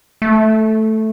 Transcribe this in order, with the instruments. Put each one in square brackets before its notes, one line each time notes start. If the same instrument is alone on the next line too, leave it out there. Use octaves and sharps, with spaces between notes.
[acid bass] A3